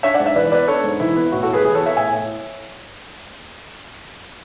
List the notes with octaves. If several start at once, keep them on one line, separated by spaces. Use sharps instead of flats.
D4 C#5 E5
D5 F#5
G#2
E5
E3 B4 D5
B3 B4 D5
D4 A4 C#5
G#2
E3 E4
B3
A2 F#4
F#4 A4
A2
G#4 B4
E3 G#4 B4
A4 C#5
B3
C#5 E5
A2 E5 G#5
A2